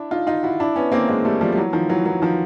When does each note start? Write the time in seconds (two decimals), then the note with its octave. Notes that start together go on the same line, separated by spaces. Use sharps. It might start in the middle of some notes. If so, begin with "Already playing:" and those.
Already playing: D4 E4
0.11 D#4 F4
0.27 D#4 F4
0.43 E4 F#4
0.60 D4 E4
0.76 B3 C#4
0.92 A#3 C4
1.09 G#3 A#3
1.25 G3 A3
1.41 F3 G3
1.52 G3
1.57 E3 F#3
1.73 D#3 F3
1.89 E3 F#3
2.06 E3 F#3
2.22 D#3 F3